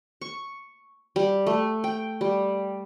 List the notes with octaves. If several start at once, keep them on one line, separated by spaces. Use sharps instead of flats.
C#6
G3
A3
G5
G3